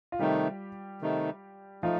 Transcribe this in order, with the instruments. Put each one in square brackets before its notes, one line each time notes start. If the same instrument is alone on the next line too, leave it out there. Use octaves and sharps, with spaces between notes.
[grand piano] F4
[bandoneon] C3 D#3 A3 D#4 [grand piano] G3 G4
[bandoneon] C3 D#3 A3 D#4
[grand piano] F3 F4 [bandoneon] A3 D#4